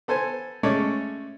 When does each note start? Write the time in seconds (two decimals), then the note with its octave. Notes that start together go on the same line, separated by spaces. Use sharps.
0.08 B3 A4 C5 G#5
0.63 G#3 A3 C#4 A4 C#5 D5